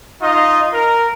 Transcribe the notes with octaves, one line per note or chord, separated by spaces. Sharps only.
D#4 F4 D#5
A#4